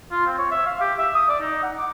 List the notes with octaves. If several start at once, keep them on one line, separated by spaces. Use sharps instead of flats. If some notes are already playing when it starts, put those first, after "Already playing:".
F4
C4
C#5
E5
F5
G4
E5
D#6
D5
D#4
F#5
D6